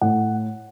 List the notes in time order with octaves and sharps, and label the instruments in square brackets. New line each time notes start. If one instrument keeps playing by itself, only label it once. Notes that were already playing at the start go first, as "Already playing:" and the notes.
[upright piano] A2 F#5